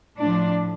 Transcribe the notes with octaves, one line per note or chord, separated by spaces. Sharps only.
A2 F3 D4